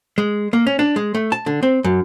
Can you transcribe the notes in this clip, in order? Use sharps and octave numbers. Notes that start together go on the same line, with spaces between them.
G#3
A#3
C#4
D4
G#3
A3
A5
D3
C4
F#2